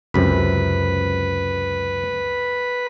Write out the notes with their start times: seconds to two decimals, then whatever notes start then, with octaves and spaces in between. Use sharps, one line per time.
0.14 C#2 F#2 C3 B4